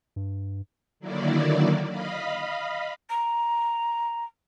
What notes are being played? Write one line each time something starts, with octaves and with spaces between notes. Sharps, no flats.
G2
D3 D#3 F#3 A#3 E4 D5
D#5 F5 B5
A#5